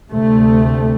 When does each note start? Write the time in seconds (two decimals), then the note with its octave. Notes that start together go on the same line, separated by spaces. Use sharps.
0.11 D2 C3 A3